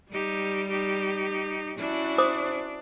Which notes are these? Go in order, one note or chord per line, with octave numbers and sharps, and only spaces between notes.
G3 D#4 G4
D#4 G4
C#4 D4 E4 F#4
C5 D6 D#6